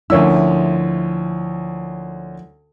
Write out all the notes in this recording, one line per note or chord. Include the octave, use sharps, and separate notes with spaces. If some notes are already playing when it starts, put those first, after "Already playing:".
D2 F3 A#3 C#4 E4 E6